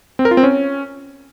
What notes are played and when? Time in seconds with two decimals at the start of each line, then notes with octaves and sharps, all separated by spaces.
0.19 C4
0.25 A#4
0.31 F4
0.37 C4
0.43 C#4